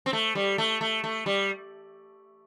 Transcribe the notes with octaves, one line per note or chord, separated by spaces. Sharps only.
C4
A3
G3
A3
A3
A3
G3